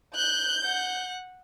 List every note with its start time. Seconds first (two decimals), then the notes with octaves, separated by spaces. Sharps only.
0.16 F#6 G6
0.64 F#5